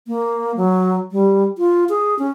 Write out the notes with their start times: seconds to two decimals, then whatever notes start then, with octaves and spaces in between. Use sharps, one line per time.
0.07 A#3
0.57 F#3
1.12 G3
1.58 F4
1.89 G#4
2.19 C#4